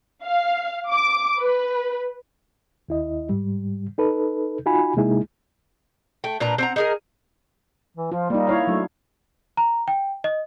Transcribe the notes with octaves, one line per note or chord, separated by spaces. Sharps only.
F5
D6
B4
D#2 E4 D#5
G#2 G3
D#4 A4 B4
D#4 F4 F#4 G#5 B5
C3 G#3 A#3 D#4 E4 G#4
A3 G5
A#2 D4 B4 A#5
C4 F#5 A#5
D#4 G#4 A#4
E3
F3 F4
G3 A#3 D#4
E4 C#5 F5
F#3 A3 D4
A#5
G5
D#5